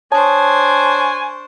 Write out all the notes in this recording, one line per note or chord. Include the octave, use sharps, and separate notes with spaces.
D4 C5 C#5 G#5 A5 C#6 D#6